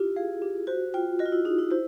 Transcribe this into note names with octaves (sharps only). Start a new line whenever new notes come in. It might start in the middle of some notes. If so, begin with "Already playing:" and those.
Already playing: E4 F4 G4
G#4 F5
G4
F#4 C5
F4 G5
F#4 D#5
F4
E4
D#4 G#4
E4
E4 C5